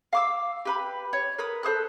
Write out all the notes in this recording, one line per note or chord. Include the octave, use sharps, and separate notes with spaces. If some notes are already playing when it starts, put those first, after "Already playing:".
F5 D6 E6
G4 B4 B5
C#5
A#4 B4 D#6
A4 C5 D#6 F#6